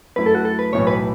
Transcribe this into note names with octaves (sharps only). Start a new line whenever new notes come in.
F#2 F#3 A3 E4 B4
A4
F#4
A4
B4
B1 A2 E3 C#5
B4